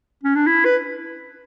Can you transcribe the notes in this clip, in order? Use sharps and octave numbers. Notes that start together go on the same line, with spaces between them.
C#4
D4
E4
B4